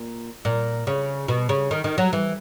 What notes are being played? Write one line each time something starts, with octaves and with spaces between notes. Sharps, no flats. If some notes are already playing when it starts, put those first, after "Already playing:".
Already playing: A#2
A#2
C#3
B2
C#3
D#3
D#3
F#3
E3